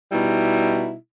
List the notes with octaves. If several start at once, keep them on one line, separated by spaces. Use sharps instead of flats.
B2 G3 D#4 E4